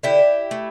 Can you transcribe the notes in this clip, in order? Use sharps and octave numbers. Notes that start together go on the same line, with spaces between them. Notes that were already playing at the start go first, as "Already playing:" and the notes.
D3 E4 G4
A3